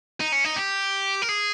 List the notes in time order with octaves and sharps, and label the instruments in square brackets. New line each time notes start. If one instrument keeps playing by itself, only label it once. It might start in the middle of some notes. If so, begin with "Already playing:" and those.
[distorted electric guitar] D#4
C#4
D#4
G4
A#4
G#4